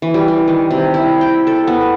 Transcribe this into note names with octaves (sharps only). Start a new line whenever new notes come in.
E3
G3
G3
D#3
C3
E4
G5
A4
B3